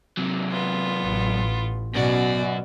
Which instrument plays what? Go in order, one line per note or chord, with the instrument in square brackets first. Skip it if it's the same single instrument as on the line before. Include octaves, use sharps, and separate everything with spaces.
[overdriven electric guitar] C3 F#3
[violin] B3 F4
[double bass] A1
[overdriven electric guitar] F#2 F#4 [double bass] B2 [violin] D5